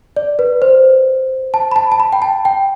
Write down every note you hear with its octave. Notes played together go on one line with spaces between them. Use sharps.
D5
B4
C5
A5
B5
A5
A5
B5
G5
A5
G5